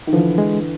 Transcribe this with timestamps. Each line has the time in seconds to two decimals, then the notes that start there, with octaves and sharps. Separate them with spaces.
0.07 D#3
0.13 D3 E3 F3
0.38 G#3